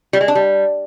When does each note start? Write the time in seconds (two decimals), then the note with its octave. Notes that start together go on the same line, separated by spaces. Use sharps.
0.13 G3
0.21 G#3
0.28 D4
0.35 G3